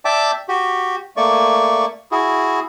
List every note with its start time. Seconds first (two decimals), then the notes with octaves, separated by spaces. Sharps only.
0.05 D5 E5 G5 A5 D6
0.49 F#4 G4
1.17 A3 A#3 D5 C#6
2.12 E4 F#4 G#4